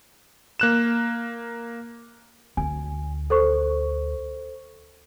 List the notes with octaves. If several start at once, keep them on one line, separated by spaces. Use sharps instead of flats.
A#3 F#6 E7
D2 G#5
A4 C5 C#6